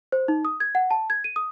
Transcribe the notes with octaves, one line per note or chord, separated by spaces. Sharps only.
C5
D#4
D#6
G#6
F#5
A5
G#6
D#7
D#6